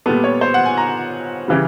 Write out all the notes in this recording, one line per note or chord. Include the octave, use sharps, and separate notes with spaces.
A#2 G3 B3 A4
C#5
C5
F#5
G#5
A#5
C#3 E3 G3